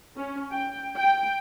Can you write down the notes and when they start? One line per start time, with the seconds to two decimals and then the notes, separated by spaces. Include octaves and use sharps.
0.16 C#4
0.52 G5
0.95 G5